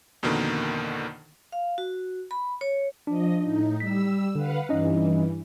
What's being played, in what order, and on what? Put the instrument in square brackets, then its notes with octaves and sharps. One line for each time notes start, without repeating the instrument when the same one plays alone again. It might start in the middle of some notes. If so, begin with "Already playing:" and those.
[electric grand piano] F2 B2 D3 D#3 A#3
[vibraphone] F5
F#4
B5
C#5
[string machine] F3 D#5 [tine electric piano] D4
[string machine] A2 D#4
[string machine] G3 E6 [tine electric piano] B6
[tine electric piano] D3 [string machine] B4 F5 F#5
[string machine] G2 E3 [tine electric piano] C#4 D#4 D#5